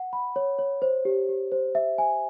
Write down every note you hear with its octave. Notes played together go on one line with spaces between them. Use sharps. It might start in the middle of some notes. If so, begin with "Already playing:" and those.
Already playing: F#5
B5
C#5
C#5
C5
G4
G4
C5
E5
G#5